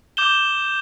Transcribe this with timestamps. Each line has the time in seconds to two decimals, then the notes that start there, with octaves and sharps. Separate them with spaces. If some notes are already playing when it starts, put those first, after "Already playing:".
0.17 D6 G6 E7 G7